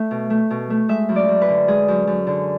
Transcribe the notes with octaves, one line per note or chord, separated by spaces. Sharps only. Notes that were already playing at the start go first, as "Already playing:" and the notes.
Already playing: A3 E5
B2
A3
B2
A3
G#3 E5
F#2
D5
F#2
B4
D3
G#3 G#4
F#2
F#2
D3